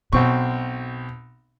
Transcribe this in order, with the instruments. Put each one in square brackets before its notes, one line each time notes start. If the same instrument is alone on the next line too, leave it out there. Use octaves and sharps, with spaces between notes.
[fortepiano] B1 C4 C#6 [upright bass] B2